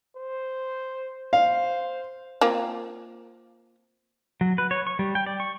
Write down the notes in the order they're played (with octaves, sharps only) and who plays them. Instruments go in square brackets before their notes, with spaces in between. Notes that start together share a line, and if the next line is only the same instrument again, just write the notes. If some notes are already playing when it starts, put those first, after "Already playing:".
[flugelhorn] C5
[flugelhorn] C5 [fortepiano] F5
[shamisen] A#3 C4 F4
[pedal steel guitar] F#3
B4
C#5
C#6
G3
G5
D5
C#6